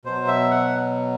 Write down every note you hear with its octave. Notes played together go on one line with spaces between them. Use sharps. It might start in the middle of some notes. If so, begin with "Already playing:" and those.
B2 F#3 C5
E5
F#5